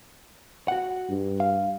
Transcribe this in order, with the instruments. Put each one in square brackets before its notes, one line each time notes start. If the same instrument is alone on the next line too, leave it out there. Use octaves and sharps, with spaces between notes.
[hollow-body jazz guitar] F#4 F#5
[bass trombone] G2
[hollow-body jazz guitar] F5